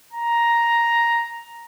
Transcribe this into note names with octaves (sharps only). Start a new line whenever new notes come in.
A#5